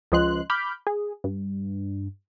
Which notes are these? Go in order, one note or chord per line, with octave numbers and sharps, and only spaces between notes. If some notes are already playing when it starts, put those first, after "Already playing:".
C#2 F3 D#5 C6 F#6
B5 D6 F6 G6
G#4
G2